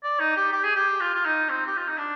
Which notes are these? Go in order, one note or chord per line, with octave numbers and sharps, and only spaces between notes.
D5
D#4
G4
G4
G#4
G4
F4
F4
D#4
C4
G4
F4
D#4
D4